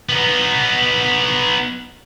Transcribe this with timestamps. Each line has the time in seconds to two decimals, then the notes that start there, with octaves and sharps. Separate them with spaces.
0.09 B3 D#4